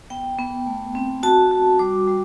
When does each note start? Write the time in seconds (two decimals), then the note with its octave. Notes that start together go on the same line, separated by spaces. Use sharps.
0.10 B3 G5
0.39 B3
0.66 A3
0.95 C4
1.23 F#4 A5
1.51 F#4
1.79 G3 D6
2.07 G3